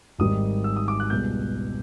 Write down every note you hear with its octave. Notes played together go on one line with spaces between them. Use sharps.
G#1 G#2 D#3 G3 D#6
E6
D#6
D6
F#6
C#2 B2 G3 G6